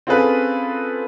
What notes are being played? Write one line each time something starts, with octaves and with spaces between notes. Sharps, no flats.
C4 C#4 F4 G#4 A4 B4